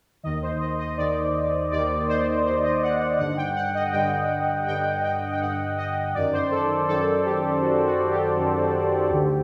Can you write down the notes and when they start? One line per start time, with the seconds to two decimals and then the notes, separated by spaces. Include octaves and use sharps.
0.23 D#2 D#3 D#5
0.42 C5
0.60 D#5
0.79 D#5
0.97 D#2 D#3 D5
1.71 D#2 D#3 D5
2.09 C5
2.45 D#2 D#3 C5
2.64 D#5
2.83 F#5
3.00 F#5
3.19 G2 D3 F#5
3.37 G5
3.56 F#5
3.74 D#5
3.93 G2 D3 G5
4.67 G2 D3 G5
5.03 G5
5.32 G5
5.40 G2 D3 F#5
5.77 D#5
6.14 F#2 D#3 D5
6.33 C5
6.51 A4
6.88 F#2 D#3 A4
7.25 G4
7.61 F#2 D#3 F#4
7.86 F#4
8.11 G4
8.36 F#2 D#3
9.09 D2 D3